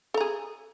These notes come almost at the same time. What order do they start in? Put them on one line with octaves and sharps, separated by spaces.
A4 A#5 G#4